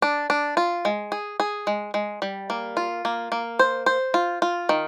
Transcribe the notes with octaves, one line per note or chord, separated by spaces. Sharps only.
D4
D4
F4
G#3
G#4
G#4
G#3
G#3
G3
A#3
F4
A#3
A#3
C5
C5
F4
F4
D#3